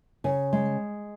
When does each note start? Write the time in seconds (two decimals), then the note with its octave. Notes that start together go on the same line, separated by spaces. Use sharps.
0.24 C#3 G#5
0.53 G#3